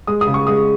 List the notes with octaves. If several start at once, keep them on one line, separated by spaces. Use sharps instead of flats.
G#3 D#6
D#6
C#3
C#6
G#3 D#6